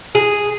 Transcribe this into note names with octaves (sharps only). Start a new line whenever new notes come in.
G#4